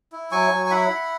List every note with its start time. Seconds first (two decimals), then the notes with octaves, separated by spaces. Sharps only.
0.12 E4
0.32 F#3 G#5 C#6
0.51 F#3
0.66 G#5
0.71 E4 F#5 B5
0.90 E4